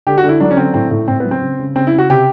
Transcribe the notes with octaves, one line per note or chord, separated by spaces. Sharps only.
D3 G4
F#4
D3
E4
F#3 D4
C#4
D3 C4
A2 C4
A2
A2 C4
B3
F#3
C4
C#3
C#3
C#3 C4
E4
C#3
F#4
C3 G4